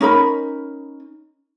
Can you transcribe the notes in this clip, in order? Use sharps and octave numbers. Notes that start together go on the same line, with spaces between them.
C#4 D#4 A#4 B5